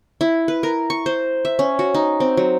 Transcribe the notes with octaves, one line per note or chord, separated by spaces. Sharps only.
E4
B4
A#4
C#6
C5
E5
C#4
F#4
D#4
C4
F#3